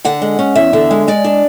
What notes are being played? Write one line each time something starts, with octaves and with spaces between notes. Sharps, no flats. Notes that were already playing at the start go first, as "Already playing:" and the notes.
D3 F#5
G#3
C#4
E2 E5
D3
G#3
G#3 D5
D4